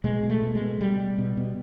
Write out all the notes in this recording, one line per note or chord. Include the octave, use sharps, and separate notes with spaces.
B2 G#3
B2
A3
B2
G#3
B2
B2 G3
B2
B2
B2